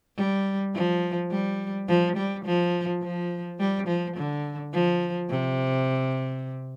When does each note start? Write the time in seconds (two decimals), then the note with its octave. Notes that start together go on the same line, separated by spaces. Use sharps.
0.17 G3
0.74 F3
1.31 G3
1.88 F3
2.16 G3
2.45 F3
3.02 F3
3.59 G3
3.87 F3
4.17 D3
4.73 F3
5.30 C3